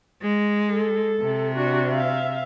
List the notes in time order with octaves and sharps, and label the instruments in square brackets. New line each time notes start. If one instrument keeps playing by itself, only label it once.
[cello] G#3
[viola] A4
[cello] C3
[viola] D4 F#4
E5 F5